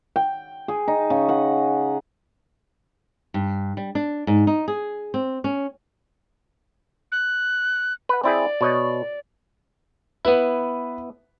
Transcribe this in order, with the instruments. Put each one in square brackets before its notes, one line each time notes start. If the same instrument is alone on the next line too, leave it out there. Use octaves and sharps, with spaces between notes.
[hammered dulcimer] G5
G#4
D#4
C#3
F#5
[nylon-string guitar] G2
G3
D4
G#2
D#4
G#4
C4
C#4
[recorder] F#6
[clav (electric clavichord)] B4 F#5
[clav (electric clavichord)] C4 E4 G#4 [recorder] D5
[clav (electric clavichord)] B2 C#5 D#5
[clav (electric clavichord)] B3 E4 [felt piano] B4